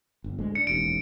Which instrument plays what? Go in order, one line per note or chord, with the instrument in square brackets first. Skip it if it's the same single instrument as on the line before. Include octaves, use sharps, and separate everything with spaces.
[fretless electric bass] G1
D2 A2 G#3
[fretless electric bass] D4 [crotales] C#7
[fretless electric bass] E1 A1 D#2 [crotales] D7